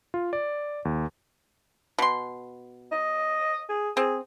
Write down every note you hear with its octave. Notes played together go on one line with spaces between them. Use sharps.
F4
D5
D#2
B2 C6
D#5
G#4
C4 G#4